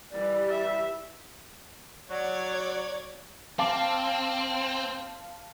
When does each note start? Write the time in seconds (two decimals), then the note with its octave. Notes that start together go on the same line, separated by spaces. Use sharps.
0.11 E3 G3 D5
0.50 E5
2.10 F#3 C#5 D5 G#6
3.59 C4 F5 A5 D6